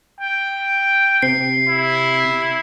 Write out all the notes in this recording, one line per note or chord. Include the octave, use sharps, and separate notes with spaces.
G5
C3 C7
E4